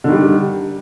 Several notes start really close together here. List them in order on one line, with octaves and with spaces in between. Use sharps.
D3 D#3 G3